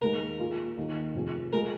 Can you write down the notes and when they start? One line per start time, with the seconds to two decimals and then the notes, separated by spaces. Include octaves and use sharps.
0.01 D#2 D#3 G#3 A#4
0.39 A#2 A#3 F4 G#4
0.77 D#2 D#3 A#3
1.14 F1 F2 F3 C4 G#4
1.53 G#3 F4 A#4